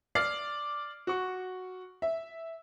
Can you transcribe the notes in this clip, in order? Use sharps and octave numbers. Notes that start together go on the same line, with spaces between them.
D5 D6 F6 C7
F#4 C#6
E5